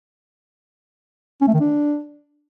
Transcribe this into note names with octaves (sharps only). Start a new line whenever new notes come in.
C#4
A3
D#3
D4